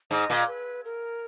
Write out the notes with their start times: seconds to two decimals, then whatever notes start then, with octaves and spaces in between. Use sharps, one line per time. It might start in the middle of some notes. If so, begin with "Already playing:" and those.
0.11 G#2 D#5
0.30 A#2
0.48 B4
0.85 A#4